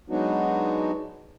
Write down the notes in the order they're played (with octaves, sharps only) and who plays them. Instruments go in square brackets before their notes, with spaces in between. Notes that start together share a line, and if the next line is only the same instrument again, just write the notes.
[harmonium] F#3 G#3 B3 D4 D#4 F#4